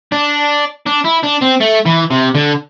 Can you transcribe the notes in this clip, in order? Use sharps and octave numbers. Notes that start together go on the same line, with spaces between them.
D4
D4
E4
D4
C4
A3
E3
C3
D3